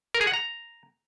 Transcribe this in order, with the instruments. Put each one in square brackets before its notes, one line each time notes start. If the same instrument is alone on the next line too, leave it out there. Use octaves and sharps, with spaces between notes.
[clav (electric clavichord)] A#4
G#4
F#5
A#5